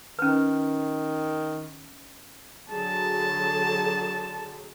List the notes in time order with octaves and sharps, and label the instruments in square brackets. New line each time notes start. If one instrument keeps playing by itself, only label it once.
[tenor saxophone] D#3 [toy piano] C#4 B4
[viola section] D3 F#3 G#4 [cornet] A5